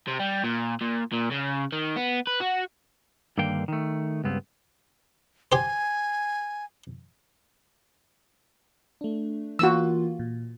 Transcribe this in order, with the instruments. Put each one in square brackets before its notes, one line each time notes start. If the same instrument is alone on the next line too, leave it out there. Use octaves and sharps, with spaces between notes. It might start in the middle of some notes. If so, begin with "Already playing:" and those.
[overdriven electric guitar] C3
G3
A#2
A#2
A#2
C#3
D#3
B3
B4
F#4
[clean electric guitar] G2 D3 D#3 A#3 F5 G5
D#3 A3
C#2 G2 B3 C4
[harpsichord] G4 C5 [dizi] G#5
[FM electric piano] A3 D4
[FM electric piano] E3 A#3 F4 [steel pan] F#4 E6
[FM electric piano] A#2